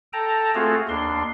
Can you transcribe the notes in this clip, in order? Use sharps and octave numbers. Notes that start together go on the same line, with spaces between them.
A4 G5 A5 A#5
A3 C4 F4 F#4 G#4 A4
D#2 D4 C6